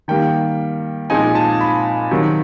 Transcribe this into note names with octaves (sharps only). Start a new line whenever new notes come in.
D#3 G3 A#3 G5
A#2 F3 G#3 C4 D#4 G#5
A5
B5
C3 D#3 F#3